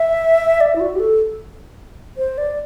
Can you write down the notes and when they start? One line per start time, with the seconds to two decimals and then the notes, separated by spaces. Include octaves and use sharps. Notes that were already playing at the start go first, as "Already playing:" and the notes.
Already playing: E5
0.61 D5
0.76 E4
0.80 F#4
0.95 G4
1.00 A4
2.18 C5
2.38 D5